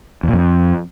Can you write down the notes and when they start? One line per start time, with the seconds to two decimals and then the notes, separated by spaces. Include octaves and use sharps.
0.23 E2
0.28 A#2
0.33 F2